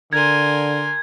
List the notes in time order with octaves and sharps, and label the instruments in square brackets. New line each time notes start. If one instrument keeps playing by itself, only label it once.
[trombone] D3 [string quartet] A#4 G#5 C6 [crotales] G#6